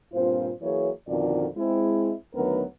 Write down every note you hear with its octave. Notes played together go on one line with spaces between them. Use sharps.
G2 A#2 C4 F4 C5
E3 F#3 A#3 G#4 C#5
F2 B2 D3 D#3 F4 D5
G#3 C4 E4
D2 D#3 F#3 B3 A#4 B4